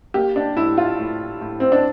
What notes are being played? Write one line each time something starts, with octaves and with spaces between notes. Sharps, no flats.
A#3 G4
D4
A2 E4
F4
A2
A2
C4
D4